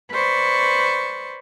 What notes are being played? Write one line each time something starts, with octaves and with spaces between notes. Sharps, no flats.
B4 C5 D5 C#6